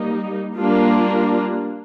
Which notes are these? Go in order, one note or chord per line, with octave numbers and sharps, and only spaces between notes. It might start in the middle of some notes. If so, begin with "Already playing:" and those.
Already playing: G3 A#3 D#4
G3 A#3 D4 F4